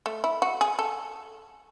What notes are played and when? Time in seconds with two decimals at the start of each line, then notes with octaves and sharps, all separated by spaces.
0.06 A3
0.24 E4
0.42 F#4
0.61 G#4
0.79 A4